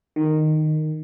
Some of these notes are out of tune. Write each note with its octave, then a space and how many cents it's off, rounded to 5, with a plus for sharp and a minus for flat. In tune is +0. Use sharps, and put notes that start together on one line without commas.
D#3 -10